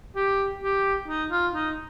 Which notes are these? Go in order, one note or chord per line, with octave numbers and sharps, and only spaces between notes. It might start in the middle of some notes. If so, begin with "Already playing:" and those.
G4
G4
D#4
F4
D#4